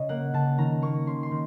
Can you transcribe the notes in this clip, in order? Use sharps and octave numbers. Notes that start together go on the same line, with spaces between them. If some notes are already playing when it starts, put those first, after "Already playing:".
Already playing: C#3 C#5 D#5
A#3 F#5
C#3 A5
D#3 A#5
A#3 C#6
C#4 C6
C6
D#3